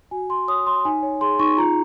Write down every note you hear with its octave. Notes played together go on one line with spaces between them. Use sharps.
F#4 G#5
F#4 C6
C#5 D#6
C#5 C6
D#4 G#5
C#5
G#4 C6
D#4 C#6
F4 A#5